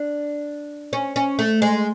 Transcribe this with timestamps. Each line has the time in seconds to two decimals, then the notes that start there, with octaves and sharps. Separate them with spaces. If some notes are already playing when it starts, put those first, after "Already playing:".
Already playing: D4
0.93 C#4
1.16 C#4
1.39 A3
1.62 G#3